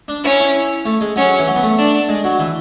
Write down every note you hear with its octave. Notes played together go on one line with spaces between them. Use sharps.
D4
C#4 E4
E4
A3
G#3
F#3 C#4
E3
F#3
B3
A3
D4
G#3
F#3
E3